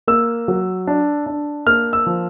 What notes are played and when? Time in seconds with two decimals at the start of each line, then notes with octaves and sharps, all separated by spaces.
0.08 A#3 E6
0.48 F#3
0.87 D4
1.26 D4
1.67 A#3 F6
1.93 E6
2.06 F3